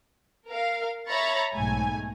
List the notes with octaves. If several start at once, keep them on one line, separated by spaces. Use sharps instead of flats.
A#4 F5
C#5 E5 A#5 B5 C#6 A6
B1 G#2 A3 G#5